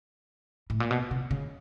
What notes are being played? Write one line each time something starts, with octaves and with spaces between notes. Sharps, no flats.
A2
A#2
B2
C3
C#3